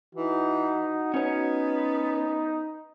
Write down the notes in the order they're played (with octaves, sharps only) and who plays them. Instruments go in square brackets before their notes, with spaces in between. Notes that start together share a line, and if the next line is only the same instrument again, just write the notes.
[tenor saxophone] E3 [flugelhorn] D#4 [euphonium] F#4
[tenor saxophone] B3 [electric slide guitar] C#4 C#5 [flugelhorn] D#4